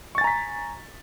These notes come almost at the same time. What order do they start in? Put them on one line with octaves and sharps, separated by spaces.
C#6 A6 G#5 A#5 B6